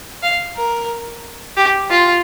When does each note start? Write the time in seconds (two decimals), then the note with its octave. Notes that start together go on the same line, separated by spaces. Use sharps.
0.23 F5
0.56 A#4
1.57 G4
1.90 F4